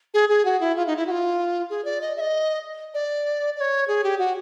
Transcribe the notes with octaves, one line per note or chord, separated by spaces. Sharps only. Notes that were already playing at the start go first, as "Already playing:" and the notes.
G#4
G#4
F#4
E4
F4
D#4
E4
F#4
F4
G#4
D5
D#5
E5
D#5
D5
D5
C#5
G#4
G4
F#4